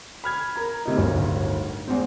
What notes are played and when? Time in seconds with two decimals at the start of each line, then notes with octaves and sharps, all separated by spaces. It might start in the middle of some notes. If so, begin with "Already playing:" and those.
0.24 B5 F6 G#6
0.56 A#4 A#5
0.85 A2 C3 D#4
0.97 D1 G1 D#3
1.88 E2 G#3 C4